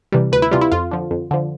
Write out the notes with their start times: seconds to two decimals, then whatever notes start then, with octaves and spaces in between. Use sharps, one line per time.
0.12 C3 E3 G3
0.32 D2 B4
0.42 E4
0.51 C3 E3 G3 F4
0.61 E4
0.72 F2 F4
0.91 D3 F3
1.11 F2
1.31 D3 F3